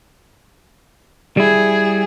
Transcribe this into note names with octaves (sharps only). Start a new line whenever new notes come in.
G3 E4 G#4